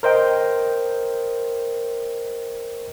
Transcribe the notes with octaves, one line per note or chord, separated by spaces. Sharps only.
A#4 C5 D#5 G5